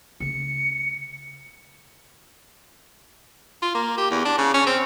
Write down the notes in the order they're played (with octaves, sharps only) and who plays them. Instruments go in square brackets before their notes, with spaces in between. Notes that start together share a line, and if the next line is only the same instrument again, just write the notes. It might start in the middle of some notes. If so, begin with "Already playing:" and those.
[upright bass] C#3 A3 [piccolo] C#7
[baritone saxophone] F4
A#3
G4
E2
D4
C#3
C#4
C4